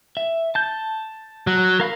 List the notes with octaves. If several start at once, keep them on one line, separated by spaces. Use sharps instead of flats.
E5
A5 G6
F#3
A#4 F5 B5